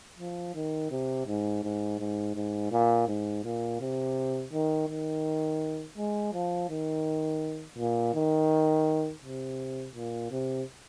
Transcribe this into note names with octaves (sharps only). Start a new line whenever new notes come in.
F3
D#3
C3
G#2
G#2
G#2
G#2
A#2
G#2
A#2
C3
D#3
D#3
G#3
F3
D#3
A#2
D#3
C3
A#2
C3